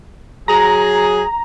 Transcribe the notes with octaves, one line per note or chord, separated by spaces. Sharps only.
F#3 G#4 A#5